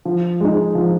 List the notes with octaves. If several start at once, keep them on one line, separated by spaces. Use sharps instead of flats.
F3
G#3 D#4
F3